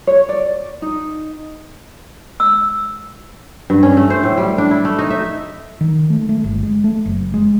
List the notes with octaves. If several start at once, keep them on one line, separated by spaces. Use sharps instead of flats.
C#5
D5
D#4
E6
G2
C#4
A3
C5
A2
G3
D4
E4
A3
D#4
E5
D#3
A3
A3
G1
G#3
A3
F#1
G#3